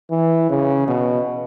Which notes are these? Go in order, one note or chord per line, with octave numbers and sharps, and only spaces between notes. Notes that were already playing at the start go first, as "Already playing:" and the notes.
E3
C#3
B2